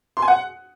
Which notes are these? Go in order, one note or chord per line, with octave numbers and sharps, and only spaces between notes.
C6
G#5
F#5